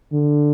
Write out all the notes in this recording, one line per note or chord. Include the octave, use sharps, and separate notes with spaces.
D3